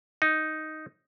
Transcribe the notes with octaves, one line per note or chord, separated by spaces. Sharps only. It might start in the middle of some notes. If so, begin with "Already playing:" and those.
D#4